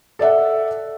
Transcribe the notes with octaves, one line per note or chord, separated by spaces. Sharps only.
A4 D5 E5 F#5